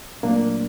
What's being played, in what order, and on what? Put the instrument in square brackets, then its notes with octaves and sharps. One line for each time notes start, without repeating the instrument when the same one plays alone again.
[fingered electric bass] A#2 F#3 A3 C4 [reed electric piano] A#3 D4